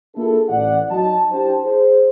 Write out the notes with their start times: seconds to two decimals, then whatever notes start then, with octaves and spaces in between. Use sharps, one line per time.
0.15 A#3 D4 E4 F4 G#4 A4
0.49 A1 D5 F#5
0.91 F#3 D#4 A5
1.31 D4 E4 G4 C5 G5 A5
1.65 G#4 C5